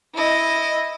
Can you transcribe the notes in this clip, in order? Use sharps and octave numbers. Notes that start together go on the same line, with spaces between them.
E4 D#5